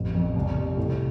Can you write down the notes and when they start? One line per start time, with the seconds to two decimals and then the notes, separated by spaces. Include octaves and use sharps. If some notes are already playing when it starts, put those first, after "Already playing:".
Already playing: A1 F2
0.15 F2
0.36 C2
0.56 C3
0.77 A2